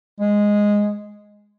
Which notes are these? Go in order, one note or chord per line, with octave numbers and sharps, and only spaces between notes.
G#3